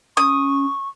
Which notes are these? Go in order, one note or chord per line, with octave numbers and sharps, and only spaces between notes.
C#4 C#6 D#6